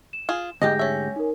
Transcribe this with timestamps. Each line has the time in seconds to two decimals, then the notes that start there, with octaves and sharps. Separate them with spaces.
0.13 E7
0.29 F4 G#4
0.62 D2 G#2 G4 D#5 G6 A#6
0.79 C#4 E5
1.16 D#4 A#4